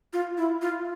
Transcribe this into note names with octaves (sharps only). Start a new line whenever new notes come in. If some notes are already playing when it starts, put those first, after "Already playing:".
F4
E4
F4